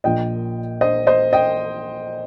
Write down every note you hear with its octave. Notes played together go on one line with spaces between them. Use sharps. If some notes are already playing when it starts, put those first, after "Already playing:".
A#1 A#2 F3 D#5 G5
C5 D#5
C5 D#5
D#5 G5